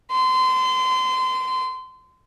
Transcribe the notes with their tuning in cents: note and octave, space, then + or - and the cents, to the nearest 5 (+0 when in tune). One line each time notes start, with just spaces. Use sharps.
C6 -30